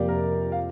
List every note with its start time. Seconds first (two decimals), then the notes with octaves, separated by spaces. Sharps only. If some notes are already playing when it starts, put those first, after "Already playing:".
Already playing: F2 C3 A#3 G4 D5 F5
0.08 A#4
0.52 F5